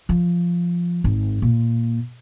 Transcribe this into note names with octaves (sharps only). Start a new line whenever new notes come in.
F3
G#1
A#2